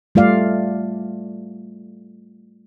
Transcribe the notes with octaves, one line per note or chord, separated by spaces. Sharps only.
G3 A3 F4 D5 F5